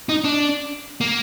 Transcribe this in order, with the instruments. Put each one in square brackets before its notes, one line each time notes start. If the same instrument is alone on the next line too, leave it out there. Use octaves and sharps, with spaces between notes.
[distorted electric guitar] D#4
D4
A#3